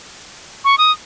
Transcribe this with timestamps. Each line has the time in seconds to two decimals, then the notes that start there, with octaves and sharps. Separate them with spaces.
0.65 C#6
0.78 D#6